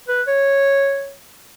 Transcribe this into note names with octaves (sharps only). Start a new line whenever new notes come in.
B4
C#5